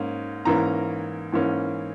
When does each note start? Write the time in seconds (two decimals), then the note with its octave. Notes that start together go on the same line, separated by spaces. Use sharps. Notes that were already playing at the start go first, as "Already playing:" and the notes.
Already playing: G#2 A#3 C#4
0.45 G#2 E3 A#3 C#4 A#5
1.32 G#2 E3 A#3 C#4